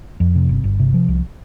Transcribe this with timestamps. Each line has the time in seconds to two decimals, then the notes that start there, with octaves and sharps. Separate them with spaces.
0.20 F2
0.35 C3
0.49 G1
0.64 G1
0.79 C3
0.94 F3
1.08 C2